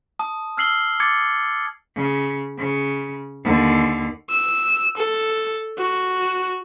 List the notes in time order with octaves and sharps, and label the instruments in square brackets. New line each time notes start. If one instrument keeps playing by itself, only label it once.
[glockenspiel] A5 D#6
E6 F6 C7 F#7 G7
D6 G#6 A6 C#7
[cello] C#3
C#3
D#2 D3
[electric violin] E6
A4
F#4